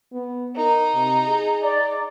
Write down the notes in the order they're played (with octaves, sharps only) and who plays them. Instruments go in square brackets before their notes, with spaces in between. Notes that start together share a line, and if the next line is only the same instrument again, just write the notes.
[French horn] B3
[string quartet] D#4 [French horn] A#4
[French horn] C3
G#4
[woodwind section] D5